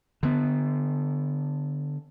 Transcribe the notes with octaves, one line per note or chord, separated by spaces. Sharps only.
D3 B3